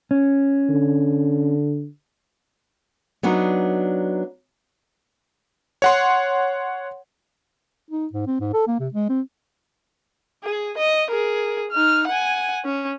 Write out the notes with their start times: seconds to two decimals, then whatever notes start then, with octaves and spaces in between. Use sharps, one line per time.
0.11 C#4
0.69 D3
3.23 F#3 B3 D4 D#4
5.82 C#5 F#5 C6
7.91 D#4
8.13 G#2
8.27 C4
8.41 G#2
8.54 A4
8.67 A#3
8.80 C3
8.94 G#3
9.09 C4
10.44 G#4
10.78 D#5
11.11 G#4 A#4
11.71 D#4 F6
12.08 F#5 G#5
12.65 C#4